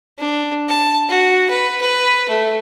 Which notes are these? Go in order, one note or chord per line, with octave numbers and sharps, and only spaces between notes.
D4
A5
F#4
B4
B4
A3